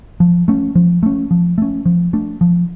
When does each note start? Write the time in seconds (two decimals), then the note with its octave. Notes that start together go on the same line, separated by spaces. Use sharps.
0.20 F3
0.48 A3 C#4
0.75 F3
1.03 A3 C#4
1.31 F3
1.58 A3 C#4
1.86 F3
2.13 A3 D4
2.41 F3